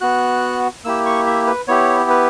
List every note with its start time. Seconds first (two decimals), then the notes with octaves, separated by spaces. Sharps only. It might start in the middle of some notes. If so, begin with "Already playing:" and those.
0.01 B3 F#4 F#6
0.85 A#3 E4 G4 E6
1.06 C#6
1.27 E5
1.47 B4
1.68 B3 E4 G4 C#5
2.10 B4